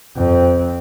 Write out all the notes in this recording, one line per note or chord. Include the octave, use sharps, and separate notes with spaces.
F2 C4